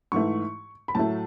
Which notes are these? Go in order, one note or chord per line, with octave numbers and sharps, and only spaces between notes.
G#2 E3 A3 C#6
B5
A2 F#3 A3 A5